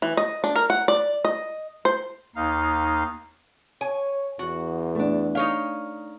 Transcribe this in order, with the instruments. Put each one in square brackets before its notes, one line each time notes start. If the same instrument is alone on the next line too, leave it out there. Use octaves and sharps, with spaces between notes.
[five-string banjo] E3
D#5
D4
A#4
F#5
D5
D#5
C5
[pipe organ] D#2 D#4 F5
[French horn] C#5 [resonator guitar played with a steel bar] G#5
[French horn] E2 [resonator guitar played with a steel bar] F#4
[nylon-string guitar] A3 D4
[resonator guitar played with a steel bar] D#4 C#5 F5